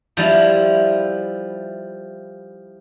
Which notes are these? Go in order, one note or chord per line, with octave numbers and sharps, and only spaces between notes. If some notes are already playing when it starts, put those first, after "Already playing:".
F3 G3 E4